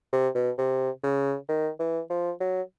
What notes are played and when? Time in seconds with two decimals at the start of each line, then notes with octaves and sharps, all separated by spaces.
0.13 C3
0.35 B2
0.58 C3
1.04 C#3
1.49 D#3
1.79 E3
2.10 F3
2.41 F#3